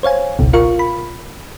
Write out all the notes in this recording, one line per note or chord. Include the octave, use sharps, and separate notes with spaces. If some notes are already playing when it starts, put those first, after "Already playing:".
C5 C#5 F5 G#5
G#1 C#2 B2
F4 A#4 F5 C#6
B5